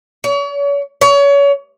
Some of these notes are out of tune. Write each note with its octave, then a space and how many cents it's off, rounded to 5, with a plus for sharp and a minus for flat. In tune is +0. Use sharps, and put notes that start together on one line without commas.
C#5 +40
C#5 +30